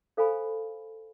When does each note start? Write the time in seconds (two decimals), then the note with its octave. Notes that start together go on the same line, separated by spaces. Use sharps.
0.17 A4 C5 F5 G#5 B5